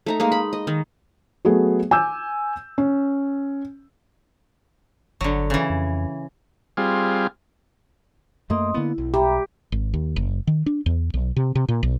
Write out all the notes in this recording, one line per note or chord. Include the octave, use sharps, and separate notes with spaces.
A3 D#4 A#5
G#3 A#3 D#4
B5
D#5
D#3
F#3 A3 B3 G#4
G#5 D6 E6 G6
C#4
G1 D3 F#3
C#3 E3
F2
G3 C4 F4 G#4
F#2 A3 A#3 D#5 C6 D#6
D3 A#3 B3 E4
B1
G4 E5 A#5 B5
G#1
D#2
F#1
D#3
D4
E2
B1
C3
C3
A#2
B1